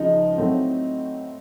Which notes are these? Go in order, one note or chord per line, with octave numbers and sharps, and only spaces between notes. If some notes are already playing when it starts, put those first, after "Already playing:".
Already playing: C#2 C#3 F3 D#4
A2 F#3 A3 C4